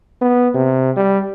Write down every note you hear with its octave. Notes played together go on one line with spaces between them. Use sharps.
B3
C3
G3